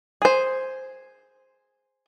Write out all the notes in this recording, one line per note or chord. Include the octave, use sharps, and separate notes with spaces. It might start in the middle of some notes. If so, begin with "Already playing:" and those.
G#4 C5